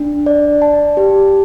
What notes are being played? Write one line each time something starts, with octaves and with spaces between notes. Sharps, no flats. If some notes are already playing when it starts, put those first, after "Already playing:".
Already playing: D4
D5
A5
G4